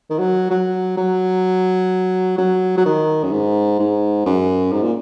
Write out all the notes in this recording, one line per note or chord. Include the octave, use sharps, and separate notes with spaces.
D#3
F#3
F#3
F#3
F#3
F#3
D#3
F#2
G#2
G#2
F#2
G#2
A#2